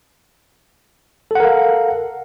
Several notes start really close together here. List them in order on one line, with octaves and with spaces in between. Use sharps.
A4 F#5 A#4 F5